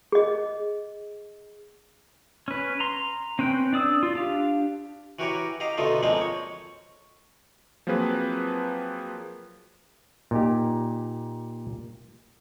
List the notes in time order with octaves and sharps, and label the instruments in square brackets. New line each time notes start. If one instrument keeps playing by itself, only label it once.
[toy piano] G#4 D#5
[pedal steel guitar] C#4 B4
A#5 C6
C4 C#4 B4 G5
D4 D5 D#6 E6
F4
D4 G4 F5
[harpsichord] E3 F#4 G4 A#4 C#5
G4 D#5 F5 A#5
B2 D3 A3 D#4 F4
F3 G#3 A#3 C4 D#4
C#5
[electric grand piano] F3 F#3 A#3 C4 G#4 B4
[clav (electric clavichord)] A#2 D#4 G4